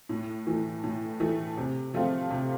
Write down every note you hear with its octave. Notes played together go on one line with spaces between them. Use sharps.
A2
E3 A3
A2
E3 A3
C3
F3 A3 C4 F4
C3